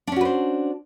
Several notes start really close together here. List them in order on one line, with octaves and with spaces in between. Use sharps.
D4 C#4 F#4 B4 C5